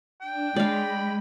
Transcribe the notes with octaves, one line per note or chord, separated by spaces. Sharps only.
D4 G5
G#3 D5 F5 B5